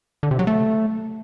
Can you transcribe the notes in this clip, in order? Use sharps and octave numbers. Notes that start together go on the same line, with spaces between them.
D3
C3
F#3
A3